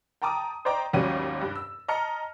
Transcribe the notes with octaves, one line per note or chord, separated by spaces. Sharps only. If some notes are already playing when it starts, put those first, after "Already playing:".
G5 A5 A#5 D6 D#6
C5 D5 D#5 G5 A#5 D6
G#1 D#2 F#3 G3 C#4 D#7
G2
E6
D#5 A5 A#5 F6 C#7